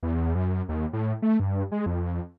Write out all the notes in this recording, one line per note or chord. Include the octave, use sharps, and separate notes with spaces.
E2
F#2
D#2
A2
A3
G2
G#3
F2